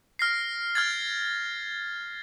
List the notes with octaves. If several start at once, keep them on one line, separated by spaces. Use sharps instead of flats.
F6 A#6 C7
F6 G#6 A6